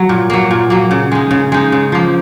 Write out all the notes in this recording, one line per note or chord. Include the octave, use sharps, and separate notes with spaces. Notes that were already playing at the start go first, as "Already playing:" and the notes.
Already playing: F#3
A#2
F#3 A#3
A#2
F#3 A#3
C#3
G#3 D#4
C#3
G#3 D#4
C#3
F3 A#3